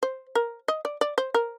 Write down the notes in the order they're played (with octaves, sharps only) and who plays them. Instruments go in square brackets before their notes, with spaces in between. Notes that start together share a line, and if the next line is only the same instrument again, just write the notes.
[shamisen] C5
A#4
D#5
D5
D5
C5
A#4